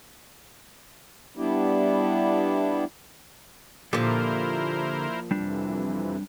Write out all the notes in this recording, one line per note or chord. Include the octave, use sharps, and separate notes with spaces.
G3 B3 D4 E4 G4
A#2 D3 F3 E4 G4 A4 A#4 C5
F2 C3 E3 G3 D4